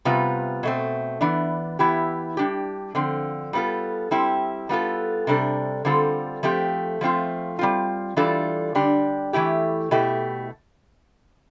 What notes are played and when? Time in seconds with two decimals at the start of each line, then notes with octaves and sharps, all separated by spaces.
0.05 C3 G3 B3 F4
0.63 B2 A3 C4
1.21 E3 B3 D4
1.79 E3 B3 E4 G4
2.37 G3 D4 G4
2.95 D3 F3 C4
3.53 G3 B3 F4 A4
4.11 G3 C4 E4 G4
4.69 G3 B3 F4 A4
5.27 C3 G3 D4 A4
5.85 D3 G3 C4 F4 A4
6.43 F3 A3 C4 G4
7.01 F3 A3 C4 F4
7.59 G3 C4 F4
8.16 E3 G3 D4 F4 A4
8.75 D3 G3 D4 G4
9.33 E3 A3 E4 G4
9.91 B2 A3 E4 G4